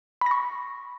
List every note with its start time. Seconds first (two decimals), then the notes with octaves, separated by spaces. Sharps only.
0.21 B5
0.26 A#6
0.31 C#6